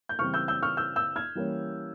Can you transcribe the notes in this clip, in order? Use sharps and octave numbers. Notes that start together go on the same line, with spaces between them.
G6
C#3 E3 G3 C4 C#6 F6
E6 G6
E6 G6
C#6 F6
E6 G6
E6 G6
F6 G#6
E3 G3 A#3 C#4